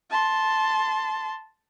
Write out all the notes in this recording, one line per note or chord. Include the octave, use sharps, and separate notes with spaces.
A5 C6